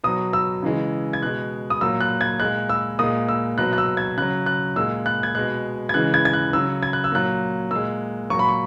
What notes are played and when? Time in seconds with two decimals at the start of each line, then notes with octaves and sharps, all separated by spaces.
0.04 B2 F#3 D#6
0.33 E6
0.63 C#3 E3 G#3
1.13 G#6
1.22 B2 G#3 F#6
1.70 D#6
1.81 A#2 F#3 E6
2.00 F#6
2.21 G#6
2.40 A#2 G#3 F#6
2.69 E6
2.99 A#2 G#3 D#6
3.29 E6
3.58 B2 F#3 F#6
3.73 F#6
3.78 E6
3.97 G#6
4.17 C#3 F#3 F#6
4.46 F#6
4.76 A#2 G#3 E6
5.06 F#6
5.23 G#6
5.35 B2 G#3 F#6
5.89 G#6
5.94 C#3 E3 G#3 F#6
6.14 G#6
6.25 G#6
6.33 F#6
6.53 C#3 F#3 E6
6.83 G#6
6.93 F#6
7.04 E6
7.12 A#2 F#3 F#6
7.71 A#2 G#3 E6
8.30 A#2 F#3 C#6
8.39 B5
8.49 C#6